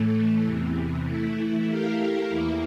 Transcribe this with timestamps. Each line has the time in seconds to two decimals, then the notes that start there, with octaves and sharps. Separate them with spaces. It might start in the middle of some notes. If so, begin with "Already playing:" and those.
Already playing: A2 E3 A3
0.44 E2 C3 E3
1.05 E3 A3 E4
1.67 A3 E4 G4 A#4 F5
2.28 E2 E3 A#3 E4